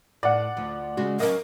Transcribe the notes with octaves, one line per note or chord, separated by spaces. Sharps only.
A2 D5 F#5
D2 F3
C#3 G#3 F#4
F#3 C#4 A#4 D#5